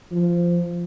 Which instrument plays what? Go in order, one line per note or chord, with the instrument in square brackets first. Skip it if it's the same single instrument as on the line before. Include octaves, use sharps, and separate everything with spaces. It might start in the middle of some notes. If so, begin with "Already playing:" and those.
[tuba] F3